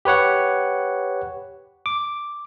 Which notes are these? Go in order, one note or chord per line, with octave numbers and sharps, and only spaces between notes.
G4 B4 C#5 F#5
D6